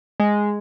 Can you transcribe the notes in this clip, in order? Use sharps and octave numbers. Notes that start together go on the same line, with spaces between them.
G#3